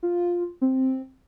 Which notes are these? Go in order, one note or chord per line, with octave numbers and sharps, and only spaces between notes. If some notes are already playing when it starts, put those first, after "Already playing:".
F4
C4